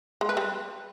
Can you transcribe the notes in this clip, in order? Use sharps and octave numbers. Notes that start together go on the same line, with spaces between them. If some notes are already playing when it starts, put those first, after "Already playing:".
G#3
B4
G3